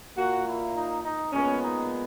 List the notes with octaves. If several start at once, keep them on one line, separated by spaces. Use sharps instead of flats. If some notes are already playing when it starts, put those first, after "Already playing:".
A#2 A#3 F#4
E4
D#4
D#4
A#2 G#3 B3 C#4
D#4